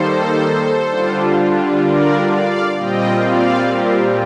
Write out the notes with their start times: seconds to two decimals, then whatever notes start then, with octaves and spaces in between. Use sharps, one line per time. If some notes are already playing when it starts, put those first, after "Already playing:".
Already playing: D#3 G3 A#3 D#4 A4 C5
0.90 D3 G3 D4 F4
1.83 A#4 D5
2.30 D5 F5
2.77 A#2 G3 C4 F4 D#5 G5
3.24 D5 F5
3.71 G4 A#4